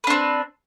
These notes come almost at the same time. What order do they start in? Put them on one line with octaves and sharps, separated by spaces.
B4 D4 C4